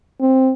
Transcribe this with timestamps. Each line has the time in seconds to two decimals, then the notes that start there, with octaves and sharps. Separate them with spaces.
0.20 C4